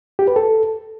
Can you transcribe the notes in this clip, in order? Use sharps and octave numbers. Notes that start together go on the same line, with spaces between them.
G4
B4
A4